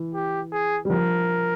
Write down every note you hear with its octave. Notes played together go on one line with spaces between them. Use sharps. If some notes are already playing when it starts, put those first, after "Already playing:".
Already playing: E3
G4
G#4
G3
F3 A#4